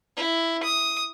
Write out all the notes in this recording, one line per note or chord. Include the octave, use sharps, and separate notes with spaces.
E4
D#6